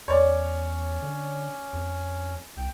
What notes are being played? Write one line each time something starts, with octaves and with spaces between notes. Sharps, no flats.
E2 C#4 C#5 D5
D3
F2
C2 G5